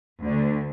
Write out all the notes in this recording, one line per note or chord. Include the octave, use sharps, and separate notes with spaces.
D2 D3